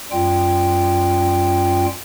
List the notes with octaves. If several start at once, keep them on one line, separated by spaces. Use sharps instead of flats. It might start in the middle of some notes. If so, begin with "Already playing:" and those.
F#2 G3 C#4 F4 G5